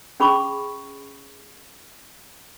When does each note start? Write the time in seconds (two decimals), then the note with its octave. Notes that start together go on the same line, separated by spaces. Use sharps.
0.20 C#4 G#4 B5 C#6 D6